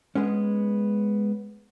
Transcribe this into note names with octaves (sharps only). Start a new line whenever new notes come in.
G#3 B3 C#4